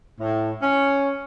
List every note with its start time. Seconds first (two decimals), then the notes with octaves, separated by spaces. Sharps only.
0.20 A2
0.61 C#4